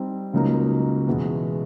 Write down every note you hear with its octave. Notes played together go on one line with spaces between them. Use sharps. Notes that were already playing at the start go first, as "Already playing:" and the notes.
Already playing: G3 C4 D#4
C#2 C#3 F#3 A#3 D#4
E2 B2 G#3 B3